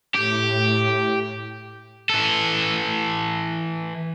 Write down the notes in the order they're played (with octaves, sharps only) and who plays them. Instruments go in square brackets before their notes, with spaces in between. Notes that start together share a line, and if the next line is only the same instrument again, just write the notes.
[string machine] A2 [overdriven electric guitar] G4
[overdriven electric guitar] E3 A4